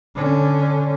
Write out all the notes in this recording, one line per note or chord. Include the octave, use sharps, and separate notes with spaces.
D3 C#4